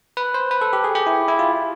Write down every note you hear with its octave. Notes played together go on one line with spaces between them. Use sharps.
B4
C5
B4
A4
G4
G#4
G4
E4
E4
F4